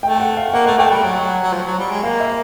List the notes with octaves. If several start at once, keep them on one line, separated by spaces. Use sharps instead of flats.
A3 G5
F#5
F5
A#3 F#5
A3 F#5
A3 G5
G3 F#5
F#3
F#3
F3
F#3
G3
G#3
A#3 F5
E5